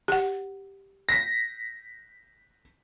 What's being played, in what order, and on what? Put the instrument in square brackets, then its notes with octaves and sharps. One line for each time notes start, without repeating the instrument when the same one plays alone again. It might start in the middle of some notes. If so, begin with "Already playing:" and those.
[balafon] G4 F#5
[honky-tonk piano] A#6 B6